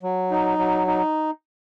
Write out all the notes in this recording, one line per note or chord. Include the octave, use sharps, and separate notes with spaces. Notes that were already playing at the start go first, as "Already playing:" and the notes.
F#3
D#4
F#3
D#4